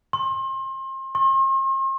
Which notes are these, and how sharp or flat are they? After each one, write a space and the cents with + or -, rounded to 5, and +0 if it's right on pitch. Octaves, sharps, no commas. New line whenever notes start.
C6 +35
C6 +45